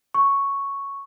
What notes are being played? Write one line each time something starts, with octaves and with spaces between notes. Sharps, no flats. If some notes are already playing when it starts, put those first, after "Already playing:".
C#6